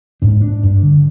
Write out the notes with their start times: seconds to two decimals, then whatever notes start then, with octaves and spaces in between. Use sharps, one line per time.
0.22 G#2 D4
0.41 D4
0.63 G2
0.82 D3